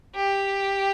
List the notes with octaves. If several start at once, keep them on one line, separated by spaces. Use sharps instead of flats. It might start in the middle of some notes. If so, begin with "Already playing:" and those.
G4